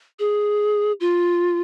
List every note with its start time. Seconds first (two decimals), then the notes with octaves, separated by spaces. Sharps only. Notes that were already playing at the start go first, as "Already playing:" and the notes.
0.19 G#4
1.00 F4